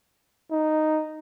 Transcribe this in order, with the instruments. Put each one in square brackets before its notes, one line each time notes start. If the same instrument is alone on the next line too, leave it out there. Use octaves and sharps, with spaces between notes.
[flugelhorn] D#4